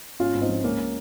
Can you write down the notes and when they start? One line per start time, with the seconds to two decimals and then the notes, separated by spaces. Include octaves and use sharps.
0.19 G#1 C#4 F4
0.34 G#1
0.41 C4 D#4
0.49 F3
0.64 C#2 A#3 C#4